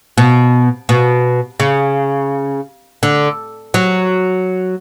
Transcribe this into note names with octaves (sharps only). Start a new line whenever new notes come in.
B2
B2
C#3
D3
F#3